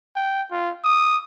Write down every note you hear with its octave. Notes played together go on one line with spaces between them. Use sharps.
G5
F4
D#6